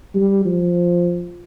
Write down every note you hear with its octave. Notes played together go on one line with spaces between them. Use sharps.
G3
F3